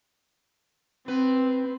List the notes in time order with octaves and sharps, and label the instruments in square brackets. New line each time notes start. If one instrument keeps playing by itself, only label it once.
[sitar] B3 B4 [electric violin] C4